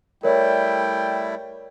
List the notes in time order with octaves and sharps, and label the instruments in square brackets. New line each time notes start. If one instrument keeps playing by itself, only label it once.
[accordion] G3 A3 E4 [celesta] A#4 C#5 D5 [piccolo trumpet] G5